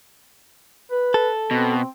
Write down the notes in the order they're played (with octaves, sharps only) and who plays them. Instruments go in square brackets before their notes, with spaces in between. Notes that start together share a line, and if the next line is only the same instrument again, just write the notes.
[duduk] B4
[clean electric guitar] A4
[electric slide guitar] B2 [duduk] C4